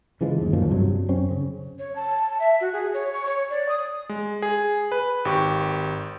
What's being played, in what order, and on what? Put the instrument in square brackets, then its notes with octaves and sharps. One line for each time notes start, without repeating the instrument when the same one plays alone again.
[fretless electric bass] C#3 E3 F3 G#3
G1 D#2
G1 F#2 A#2 F3
G2 C3 F#3 D4
F#2 C4 C#4
C#3
[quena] C#5
A5
E5
F#4
G#4
C#5
C#6
C#5
D5
D#6
[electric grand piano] G#3
G#4
B4
G#1 G4 C#6